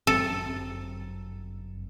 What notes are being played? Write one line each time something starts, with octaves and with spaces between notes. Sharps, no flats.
G1 F#2 C4 A4